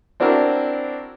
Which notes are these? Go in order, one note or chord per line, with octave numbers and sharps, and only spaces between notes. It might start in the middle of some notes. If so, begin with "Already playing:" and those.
C4 D4 E4 F#4 A#4